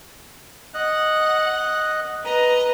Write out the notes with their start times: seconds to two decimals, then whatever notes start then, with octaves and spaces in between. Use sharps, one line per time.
0.74 D#5 F#5 F#6
2.24 B4 D#5 A#5